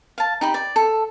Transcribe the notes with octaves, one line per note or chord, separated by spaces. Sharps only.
F5 A5
D#4 G4 B5
D5
A4